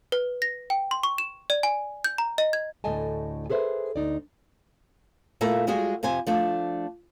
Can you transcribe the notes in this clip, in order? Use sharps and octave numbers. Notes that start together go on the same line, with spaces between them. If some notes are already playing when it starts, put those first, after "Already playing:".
B4
A#6
G5
C6
C#6
E7
D5
G#5
G6
A#5
D#5
G#6
D2 A2 A4 D#5 G#5 A5
G#4 A4 B4 C5 E5
D2 D#4 D5
A#2 A3 A#3 E4 A4
G3 G#3 F4 F#4 G#4
F2 C3 C5 G#5
F3 A3 D4